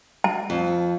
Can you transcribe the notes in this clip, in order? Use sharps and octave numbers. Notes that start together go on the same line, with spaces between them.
A5
F2